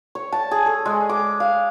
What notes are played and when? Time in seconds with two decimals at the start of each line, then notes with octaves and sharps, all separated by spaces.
0.15 C#5
0.32 A5
0.51 G#4
0.66 A4
0.86 G#3
1.09 D6
1.40 F5